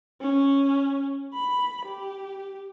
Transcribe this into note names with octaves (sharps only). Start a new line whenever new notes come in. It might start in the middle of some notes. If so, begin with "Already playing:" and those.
C#4
B5
G4